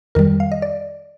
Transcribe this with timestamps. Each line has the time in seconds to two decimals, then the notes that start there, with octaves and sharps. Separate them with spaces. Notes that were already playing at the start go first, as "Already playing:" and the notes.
0.15 F2 D#3 G3 A#4
0.40 F5
0.52 D#5
0.62 D5